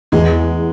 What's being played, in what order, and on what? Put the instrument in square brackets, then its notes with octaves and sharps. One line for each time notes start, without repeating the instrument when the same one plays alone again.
[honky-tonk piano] E2 [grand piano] G#3 G#4